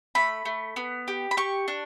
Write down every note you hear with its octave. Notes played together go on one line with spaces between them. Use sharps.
A3 B5
A3
B3
G4
B5
G4 C#6
D4